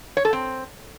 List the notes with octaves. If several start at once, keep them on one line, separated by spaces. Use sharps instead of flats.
C#5
A4
C4